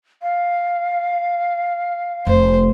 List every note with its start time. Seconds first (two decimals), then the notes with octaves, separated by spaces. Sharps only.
0.22 F5
2.27 F1 C5